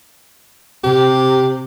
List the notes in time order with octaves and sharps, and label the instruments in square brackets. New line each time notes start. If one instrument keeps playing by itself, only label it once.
[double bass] C3 [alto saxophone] G4